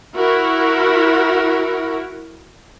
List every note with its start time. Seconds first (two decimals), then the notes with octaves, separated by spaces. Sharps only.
0.17 E4 F#4 A#4